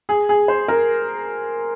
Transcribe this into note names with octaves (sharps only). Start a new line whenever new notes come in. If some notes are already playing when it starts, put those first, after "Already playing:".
G#4
G#4
C5
A#4